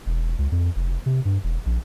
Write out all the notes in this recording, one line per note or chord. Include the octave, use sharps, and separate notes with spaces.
E1
C#2
F2
F1
C3
G2
E1
A#1